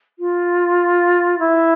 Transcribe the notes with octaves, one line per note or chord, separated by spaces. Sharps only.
F4
E4